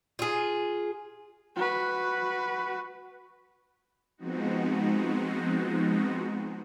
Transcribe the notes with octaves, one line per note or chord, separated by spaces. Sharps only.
F4 G#4
F#4 B4
F3 G#3 B3 C4 D#4 F#4